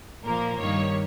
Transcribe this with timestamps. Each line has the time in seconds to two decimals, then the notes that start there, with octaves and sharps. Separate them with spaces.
0.24 A#2 F3 A#3 A#4
0.59 G2 D#3 G3 A#3 C#5